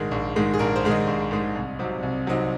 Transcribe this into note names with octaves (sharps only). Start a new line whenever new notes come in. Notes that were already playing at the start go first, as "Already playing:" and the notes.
Already playing: A#1 G#2 D#3 G#3
A#1
G#2 D#3 G#3
G#4
A#1 A#4
C5
G#2 D#3 G#3
D#5
A#1
G#2 D#3 G#3
C2
C3 F#3 C4 D#4
C2
C3 F#3 C4 D#4